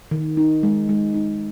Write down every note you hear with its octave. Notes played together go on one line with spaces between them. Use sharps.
D#3
D#4
G#3
G#3
D#4